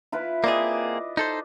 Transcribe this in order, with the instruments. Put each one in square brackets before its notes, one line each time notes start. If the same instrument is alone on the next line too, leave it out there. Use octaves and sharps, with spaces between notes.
[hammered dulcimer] E4 F4 B4
[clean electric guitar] A#3 C4 G#4 [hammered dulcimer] D5 D#5
[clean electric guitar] D#4 A4 C5